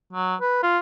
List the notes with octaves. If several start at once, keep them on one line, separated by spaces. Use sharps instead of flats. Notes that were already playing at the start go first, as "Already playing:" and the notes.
F#3
B4
F4